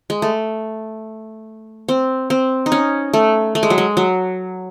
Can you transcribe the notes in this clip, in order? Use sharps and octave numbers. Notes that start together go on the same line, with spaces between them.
G#3
A3
C4
C4
D#4
C#4
A3
A3
G#3
F#3
G#3
F#3